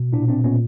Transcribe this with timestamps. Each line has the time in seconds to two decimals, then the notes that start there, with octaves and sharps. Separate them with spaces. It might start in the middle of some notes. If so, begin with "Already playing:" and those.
Already playing: B2
0.13 A#2 D4 E4
0.28 C4 D4
0.44 A#2 B3 C#4